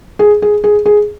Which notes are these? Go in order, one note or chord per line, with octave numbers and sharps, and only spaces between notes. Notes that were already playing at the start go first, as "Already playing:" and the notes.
G#4
G#4
G#4
G#4